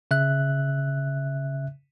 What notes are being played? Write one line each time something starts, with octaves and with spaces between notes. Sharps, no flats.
C#3 E5 F#6